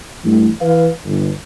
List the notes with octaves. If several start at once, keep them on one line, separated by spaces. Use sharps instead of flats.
G2 E3 A3
E3 B4 F5
G1